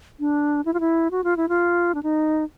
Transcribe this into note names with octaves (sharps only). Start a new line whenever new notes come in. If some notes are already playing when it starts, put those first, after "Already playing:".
D4
E4
F4
E4
F#4
F4
E4
F4
D4
D#4